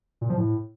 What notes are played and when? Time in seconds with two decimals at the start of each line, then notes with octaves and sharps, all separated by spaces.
0.21 A#2
0.29 F3
0.38 A2